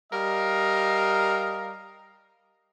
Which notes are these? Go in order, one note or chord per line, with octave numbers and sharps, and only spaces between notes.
G3 A#4 D#5 F5